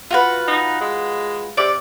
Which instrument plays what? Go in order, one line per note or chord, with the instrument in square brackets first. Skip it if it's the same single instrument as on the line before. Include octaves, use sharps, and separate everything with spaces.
[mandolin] F4 F#4 B4
[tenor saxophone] D#4
G#3
[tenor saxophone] C3 [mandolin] D5 D6